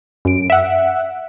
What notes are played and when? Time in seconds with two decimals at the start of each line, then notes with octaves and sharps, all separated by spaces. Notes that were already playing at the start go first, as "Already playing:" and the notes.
0.25 F#2 D7
0.50 E5 F#5